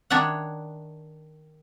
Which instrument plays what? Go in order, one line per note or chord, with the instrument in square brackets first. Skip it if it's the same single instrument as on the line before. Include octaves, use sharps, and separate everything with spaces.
[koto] D#3 D4 C#5 E5 F#5